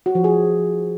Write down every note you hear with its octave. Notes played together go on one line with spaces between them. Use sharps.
F#4
F3
G#4